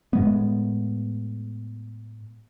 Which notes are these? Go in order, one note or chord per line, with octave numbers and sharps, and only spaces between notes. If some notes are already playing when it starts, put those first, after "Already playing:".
A2 G#3 B3